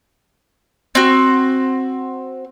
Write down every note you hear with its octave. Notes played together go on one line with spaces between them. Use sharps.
C4 F#4